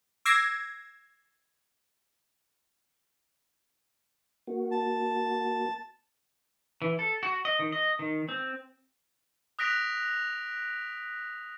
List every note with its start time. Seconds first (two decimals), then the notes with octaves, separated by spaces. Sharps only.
0.25 D6 E6 G#6 A#6 C7
4.47 A#3 F#4
4.71 A5
6.82 E3
6.99 A4
7.23 F#4
7.45 D#5
7.59 D#3
7.72 D#5
7.99 D#3
8.29 C4
9.59 D#6 F#6 A#6 B6 D7 F7